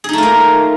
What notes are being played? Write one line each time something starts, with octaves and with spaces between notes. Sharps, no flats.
A3 A#3 D#4 F4 G#4